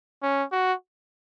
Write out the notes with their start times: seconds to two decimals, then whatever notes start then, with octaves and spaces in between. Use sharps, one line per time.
0.22 C#4
0.52 F#4